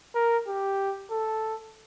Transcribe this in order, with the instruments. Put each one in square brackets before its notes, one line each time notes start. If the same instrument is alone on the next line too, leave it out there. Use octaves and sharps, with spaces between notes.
[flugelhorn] A#4
G4
A4